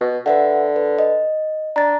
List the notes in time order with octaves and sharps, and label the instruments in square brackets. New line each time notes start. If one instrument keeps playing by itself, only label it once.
[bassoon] B2
[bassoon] D3 [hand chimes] B4 E5 F#5
[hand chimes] B4
D#5
[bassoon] D4 [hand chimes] A#5 A6